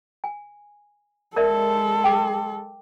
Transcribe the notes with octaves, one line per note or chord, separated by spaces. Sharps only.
G#5
G#3 A4 A#4 D5 E5
G5 D6